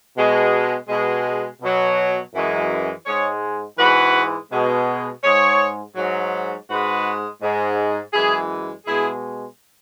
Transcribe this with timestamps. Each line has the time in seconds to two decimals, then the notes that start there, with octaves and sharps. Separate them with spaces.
0.16 B2 G#3
0.88 B2 G#3
1.61 B2 F#3
2.33 F#2 E3 G#3
3.06 G#2 G#3 G#4 C#5
3.78 G#2 E3 G#3 F#4 B4
4.51 B2 G#3
5.23 G#2 G#3 G#4 C#5
5.96 G#2 F#3
6.68 G#2 G#3 F#4 B4
7.41 G#2 G#3
8.13 F#2 E3 G#3 E4 G#4
8.86 B2 G#3 E4 G#4